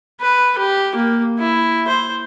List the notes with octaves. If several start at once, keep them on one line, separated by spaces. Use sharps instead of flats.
B4
G4
A#3
E4
C5